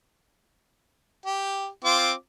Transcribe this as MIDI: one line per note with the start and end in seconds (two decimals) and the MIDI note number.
1.26 1.68 67
1.85 2.12 60
1.85 2.12 65
1.85 2.12 86